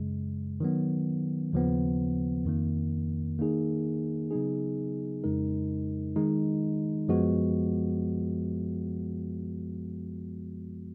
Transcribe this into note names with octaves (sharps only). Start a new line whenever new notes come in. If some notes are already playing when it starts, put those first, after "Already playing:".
Already playing: F#2 C#3 G#3
D#3 F#3 B3
D#2 C#3 F3 B3
F2 D#3 A#3
D#3 A#3 D#4 G#4
C#3 F#3 B3 D#4 G#4
F2 C#3 G#3 D#4 A#4
D#3 G#3 D#4
F#2 F3 G#3 B3 F#4